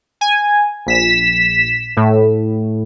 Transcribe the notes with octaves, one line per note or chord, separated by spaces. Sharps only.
G#5
A#1 B6 E7
A2